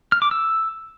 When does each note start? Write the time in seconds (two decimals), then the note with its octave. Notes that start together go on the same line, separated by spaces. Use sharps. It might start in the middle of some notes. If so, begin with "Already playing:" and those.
0.12 F6
0.22 D6
0.31 E6